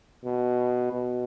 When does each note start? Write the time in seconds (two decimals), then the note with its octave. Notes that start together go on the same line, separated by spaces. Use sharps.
0.24 B2
0.93 B2